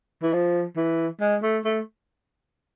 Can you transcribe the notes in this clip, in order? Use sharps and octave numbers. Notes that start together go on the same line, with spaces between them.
E3
F3
E3
G#3
A3
A3